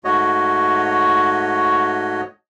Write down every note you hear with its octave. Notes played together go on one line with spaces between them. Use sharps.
G#2 A3 F#4 C#5 D#5